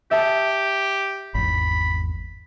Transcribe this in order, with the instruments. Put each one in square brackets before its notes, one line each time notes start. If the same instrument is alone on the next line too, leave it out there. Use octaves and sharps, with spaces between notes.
[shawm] G4 [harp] E5 A5 D#6
[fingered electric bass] G#1 E2 [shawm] B5